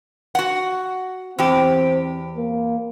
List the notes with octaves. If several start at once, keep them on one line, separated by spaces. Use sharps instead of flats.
F#4 F#5
E2 C4 G4
A#3